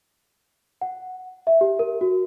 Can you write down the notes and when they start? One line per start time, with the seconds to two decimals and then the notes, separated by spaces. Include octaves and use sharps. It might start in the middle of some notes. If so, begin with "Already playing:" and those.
0.81 F#5
1.47 E5
1.61 G4
1.79 A#4
2.01 F#4